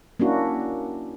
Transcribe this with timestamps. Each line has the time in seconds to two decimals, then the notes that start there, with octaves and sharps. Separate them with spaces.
0.20 A#3 C#4 D4 E4 F#4